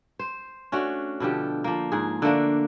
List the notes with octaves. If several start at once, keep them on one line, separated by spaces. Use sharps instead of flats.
C5
A3 C#4 D4 F#4
B2 D3 F3 G4
F3 A#3
G#2 G#4
D3 A3 A#3 D4